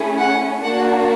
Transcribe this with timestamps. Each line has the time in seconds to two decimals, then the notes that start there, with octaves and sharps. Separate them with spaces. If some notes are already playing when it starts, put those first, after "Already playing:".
Already playing: A3 C#4 E4 G#4
0.19 F#5
0.62 A#3 D4 F#4 F#5